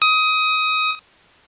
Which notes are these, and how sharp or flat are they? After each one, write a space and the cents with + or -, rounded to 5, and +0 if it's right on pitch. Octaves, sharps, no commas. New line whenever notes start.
D#6 +20